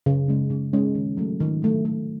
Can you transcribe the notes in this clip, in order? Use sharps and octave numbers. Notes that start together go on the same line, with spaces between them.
C#3
G#3 C#4
C#3
G#3 C#4
D#3
F#3 A3
D#3
F#3 A3
A3